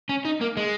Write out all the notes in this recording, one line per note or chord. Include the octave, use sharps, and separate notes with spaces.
C#4
D#4
A#3
G#3